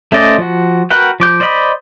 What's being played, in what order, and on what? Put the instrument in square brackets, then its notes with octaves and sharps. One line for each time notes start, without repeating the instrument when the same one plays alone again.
[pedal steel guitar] A3 C#4 C5 D5 D#5
F3 F#4
F#4 A#4 B4 F#5 G5
F3 D6 G6
C5 D5 D#5 F5 B5